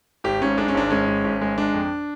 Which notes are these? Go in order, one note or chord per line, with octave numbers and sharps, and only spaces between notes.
G#1 G4
G#2 C#4
G#3 D4
C#4
G#1 D4
G#3 C#4
G#1
G#1
G#3
G#3 D4
F2